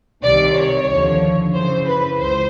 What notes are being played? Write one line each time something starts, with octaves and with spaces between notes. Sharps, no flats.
C2 C3 D#3 D5
C#5
D#2 D3 F3
F#2 C#3 E3 C5
B4
C#2 C5